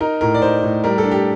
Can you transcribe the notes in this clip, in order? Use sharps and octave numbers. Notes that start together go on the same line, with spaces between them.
D#4 A#4
A2 A#4
D5
D#4 C5
A2
G3 A#4
A4
D4
G4